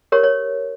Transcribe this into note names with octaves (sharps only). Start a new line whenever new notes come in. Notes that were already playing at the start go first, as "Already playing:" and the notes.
G4 A#4 C#5
C#5